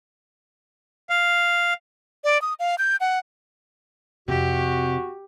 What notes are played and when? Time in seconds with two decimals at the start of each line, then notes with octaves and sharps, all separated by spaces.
1.10 F5
2.24 D5
2.42 D#6
2.60 F5
2.78 G6
3.00 F#5
4.28 F2 C3 F#4 G4